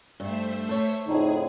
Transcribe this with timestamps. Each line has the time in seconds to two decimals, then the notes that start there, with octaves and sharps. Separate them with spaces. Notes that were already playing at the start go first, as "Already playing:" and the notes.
0.20 G2 A3 C5 E5
0.69 A4 C#5
1.06 F2 A2 D3 D#4 G#4